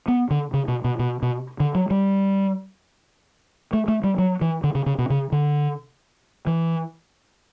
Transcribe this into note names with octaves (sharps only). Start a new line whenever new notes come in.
B3
D3
C#3
B2
B2
B2
B2
D3
F#3
G3
A3
A3
G3
F#3
E3
D3
C#3
C#3
B2
C#3
D3
E3